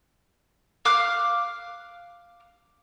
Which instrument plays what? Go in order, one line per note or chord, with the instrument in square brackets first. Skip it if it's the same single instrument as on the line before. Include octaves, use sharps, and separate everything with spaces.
[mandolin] F5 D6 F6 F#6